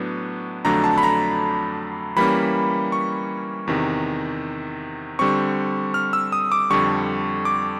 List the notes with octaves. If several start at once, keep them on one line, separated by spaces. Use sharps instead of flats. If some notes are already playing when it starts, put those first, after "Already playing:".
Already playing: A2 F#3 B3 D4
F2 D3 F#3 A3 D4 A#5
A5
B5
A#5
E3 G3 A#3 C#4 B5
C#6
E2 C3 D#3
D3 G3 C4 C#6
F6
E6
D#6
D6
F2 D3 G3 C#6
D6